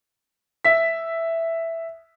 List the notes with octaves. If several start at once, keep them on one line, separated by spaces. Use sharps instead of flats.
E5 B6